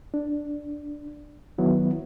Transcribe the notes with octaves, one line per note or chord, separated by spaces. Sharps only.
D4
D#3 F#3 B3 E4